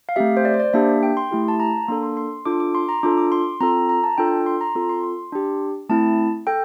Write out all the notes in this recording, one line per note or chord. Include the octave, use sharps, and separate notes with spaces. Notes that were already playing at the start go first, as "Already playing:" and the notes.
F5
A3 C4 G4 E5
C5
D5
C5
D5
A#3 D4 G4 E5
G5
C6
A3 E4 G4
A5
A#5
A#3 D4 A4 C6
C6
C6
D4 F4 A4 D6
D6
C6
A#5
D4 F4 A4 D6
D6
C6
C4 F4 A4 A#5
A#5
A5
D4 F4 A4 G5
C6
A#5
C4 F4 A4
C6
C6
D4 G4
A3 C4 E4 A5
A4 G5